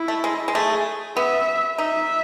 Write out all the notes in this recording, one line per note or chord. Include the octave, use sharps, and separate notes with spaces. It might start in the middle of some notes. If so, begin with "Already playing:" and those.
Already playing: E4
A3
G#3
G#3
A3 G#4
B3 E5
D#4 E5